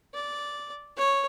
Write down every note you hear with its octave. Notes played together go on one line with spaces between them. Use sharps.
D5
C#5